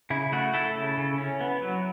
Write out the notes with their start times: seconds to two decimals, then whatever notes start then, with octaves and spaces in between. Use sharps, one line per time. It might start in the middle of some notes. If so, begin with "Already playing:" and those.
0.10 C#3 E4
0.32 A3 F#4
0.53 A3 E4 A4
0.75 C#3
0.97 C#3
1.18 C#4
1.41 B3
1.62 F#3